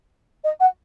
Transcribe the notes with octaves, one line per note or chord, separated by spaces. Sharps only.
D#5
F#5